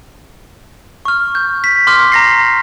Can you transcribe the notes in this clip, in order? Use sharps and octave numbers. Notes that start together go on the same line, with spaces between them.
C#6 F6
G6
B6
C6 D6 F6
A#5 A#6 C7